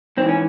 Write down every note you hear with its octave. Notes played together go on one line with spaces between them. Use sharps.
G#2 E3 C4
C#4